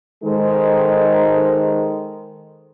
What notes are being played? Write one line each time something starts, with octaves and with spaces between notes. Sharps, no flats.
D#3 G#3 D#4 A4 C5